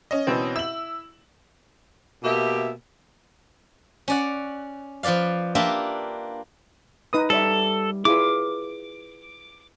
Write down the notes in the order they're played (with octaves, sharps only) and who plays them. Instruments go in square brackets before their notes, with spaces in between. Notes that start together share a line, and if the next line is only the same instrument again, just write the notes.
[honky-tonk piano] C#4 D#5
[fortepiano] B2 E3 C4
[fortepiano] E4 [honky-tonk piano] E6 F#7
[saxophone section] B2 A#3 G4 E5
[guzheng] C#4 D5 F#5
F3 F4 B4 D5 F5
A#3 D4 F4 G4 B4 E5
[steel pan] D#4 B4 D#6
[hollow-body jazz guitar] G3 C#5 E5 [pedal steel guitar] A4
[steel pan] E4 F4 [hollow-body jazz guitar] G#4 B4 [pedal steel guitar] D6